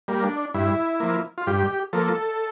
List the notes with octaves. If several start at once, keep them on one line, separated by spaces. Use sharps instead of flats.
G3 A#3
D4
G2 E4
F3 A#3
F4
G2 G4
F3 A#3 A4